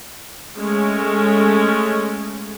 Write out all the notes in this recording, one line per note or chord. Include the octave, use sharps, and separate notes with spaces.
G#3 A3 C#4